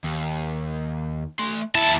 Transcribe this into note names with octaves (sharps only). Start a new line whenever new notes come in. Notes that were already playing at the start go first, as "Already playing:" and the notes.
D#2
A3 C6
D#2 E4 A5